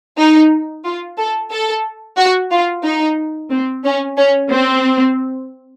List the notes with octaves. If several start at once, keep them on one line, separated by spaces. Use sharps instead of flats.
D#4
F4
A4
A4
F#4
F4
D#4
C4
C#4
C#4
C4